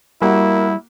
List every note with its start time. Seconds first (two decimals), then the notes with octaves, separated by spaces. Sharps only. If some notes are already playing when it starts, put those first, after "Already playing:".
0.22 G3 A#3 E4 F#4